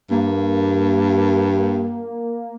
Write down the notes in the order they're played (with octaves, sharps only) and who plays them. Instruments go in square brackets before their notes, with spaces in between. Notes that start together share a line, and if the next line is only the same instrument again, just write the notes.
[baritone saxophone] G2 [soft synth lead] A#3